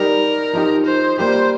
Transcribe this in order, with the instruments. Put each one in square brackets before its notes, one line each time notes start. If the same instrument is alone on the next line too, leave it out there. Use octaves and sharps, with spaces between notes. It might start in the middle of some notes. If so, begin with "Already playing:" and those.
Already playing: [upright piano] G3 D#4 G4 [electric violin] A#4
[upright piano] F3 D#4 G4
[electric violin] C5
[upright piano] G3 A#3 G4 [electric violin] C5